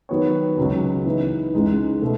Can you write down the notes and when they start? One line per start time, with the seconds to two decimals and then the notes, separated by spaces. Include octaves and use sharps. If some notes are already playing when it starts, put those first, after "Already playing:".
0.09 D#3 F#3 B3 F#4 C#5
0.57 C#2 C#3 F#3
1.05 E3 B3 D#4
1.54 C#2 C#3 G#3 D#4
2.02 B2 A3